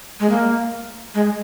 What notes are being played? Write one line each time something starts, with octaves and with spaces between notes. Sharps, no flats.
G#3
A#3
G#3